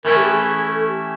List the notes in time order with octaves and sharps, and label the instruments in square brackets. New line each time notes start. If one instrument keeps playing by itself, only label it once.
[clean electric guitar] E3 A3 C#4 E4 [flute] A#4
[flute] G4
G#4
G#4
A4
G4